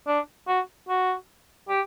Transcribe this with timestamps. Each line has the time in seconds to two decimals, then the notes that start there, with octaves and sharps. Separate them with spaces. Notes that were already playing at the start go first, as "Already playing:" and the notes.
0.07 D4
0.48 F#4
0.89 F#4
1.69 G4